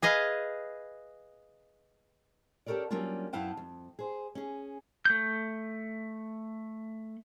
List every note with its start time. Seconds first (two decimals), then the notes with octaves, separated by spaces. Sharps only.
0.02 G#4 B4 D#5 F5
2.66 C#4 G4 A4 A#4 C#5 D5
2.90 F#3 G3 A#3 C#4 D4 F4
3.33 F#2 B3 E4 F5 G5 A5
3.57 F2
3.99 G#4 C5
4.35 C#4 G#4
5.05 A3 G6